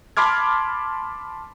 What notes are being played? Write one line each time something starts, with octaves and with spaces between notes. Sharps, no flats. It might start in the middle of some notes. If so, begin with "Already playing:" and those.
A5 B5 C6 D6 F6 G#6